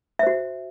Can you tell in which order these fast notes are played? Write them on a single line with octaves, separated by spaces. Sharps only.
E5 C5 F#4